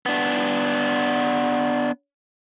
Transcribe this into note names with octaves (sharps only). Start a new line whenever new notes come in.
B3 D4